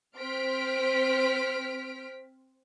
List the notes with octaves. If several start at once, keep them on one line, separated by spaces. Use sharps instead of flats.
C4 C5 F6 B6 D7